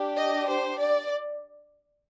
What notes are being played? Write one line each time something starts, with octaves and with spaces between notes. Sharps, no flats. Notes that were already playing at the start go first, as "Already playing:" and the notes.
Already playing: D4 G4
D#5
C5
D5